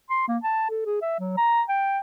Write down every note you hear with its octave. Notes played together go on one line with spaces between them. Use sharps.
C6
A#3
A5
A4
G#4
E5
F#3
A#5
G5